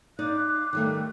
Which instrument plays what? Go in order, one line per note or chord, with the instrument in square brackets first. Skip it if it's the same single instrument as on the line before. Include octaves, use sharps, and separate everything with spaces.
[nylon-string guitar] D#4 D5 [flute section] F5 D6 F#6
[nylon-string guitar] D#3 G3 A3